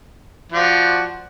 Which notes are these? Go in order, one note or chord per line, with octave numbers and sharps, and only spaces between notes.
F3 F#4 D5